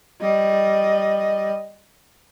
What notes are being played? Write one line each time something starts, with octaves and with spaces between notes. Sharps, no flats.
G3 D#5